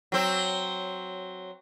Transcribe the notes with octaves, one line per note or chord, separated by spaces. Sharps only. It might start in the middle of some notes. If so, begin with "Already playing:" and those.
F#3 C4